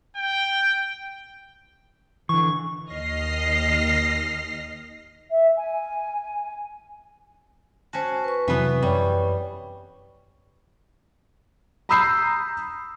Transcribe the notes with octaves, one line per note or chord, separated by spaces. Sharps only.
G5
D3 E3 C#6
D#2 D#5 F6 A#6 C7
E5
G#5
C#4 F#4 C5 A5
B4 C#6
F2 C3 E3 F#3 B3
F#2 G3 C#5
A#5 B5 D#6 E6 G6 C7